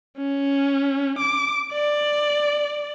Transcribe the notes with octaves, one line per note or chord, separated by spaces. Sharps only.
C#4
D6
D5